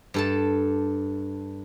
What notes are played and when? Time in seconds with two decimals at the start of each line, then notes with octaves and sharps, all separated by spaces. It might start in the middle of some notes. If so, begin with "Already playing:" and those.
0.14 G2 A4 A5